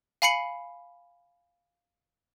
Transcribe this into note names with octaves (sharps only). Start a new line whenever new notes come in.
F5 G#5 B5 C7 C#7 F#7